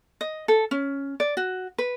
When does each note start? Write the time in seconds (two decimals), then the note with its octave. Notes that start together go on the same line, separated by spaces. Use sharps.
0.21 D#5
0.48 A4
0.71 C#4
1.20 D5
1.37 F#4
1.78 B4